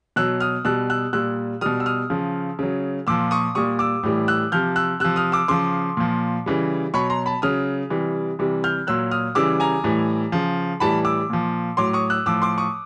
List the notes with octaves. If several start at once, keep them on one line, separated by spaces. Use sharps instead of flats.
B2 F#3 E6 F#6
D#6 F6
B2 G3 E6 F#6
E6 F#6
A#2 G3 E6 F#6
B2 G3 D#6 F6
E6
D#6 F6
C#3 F3
C#3 F#3
A#2 F3 D6 E6
C#6 D#6
A#2 G3 C#6 D#6
D6 E6
A2 E3 G3
E6 F#6
C3 F3 F6 G6
E6 F#6
C3 F3 E6 F#6
D#6 F6
D6 E6
C#3 F3 C6 D6
A#2 F3
C#3 E3 G3
B2 F#3 B5 C#6
A#5 C6
A5 B5
C#3 F#3 D#6 F6
C3 E3 G3
C3 E3 G3
F6 G6
A#2 F#3 E6 F#6
D#6 F6
C#3 E3 G3 D6 E6
G#5 A#5
A2 E3 G3
C#3 F3
A2 E3 G3 A5 B5
D6 E6
A#2 F3
A2 F#3 C6 D6
C#6 D#6
E6 F#6
A2 F3 D6 E6
C6 D6
C#6 D#6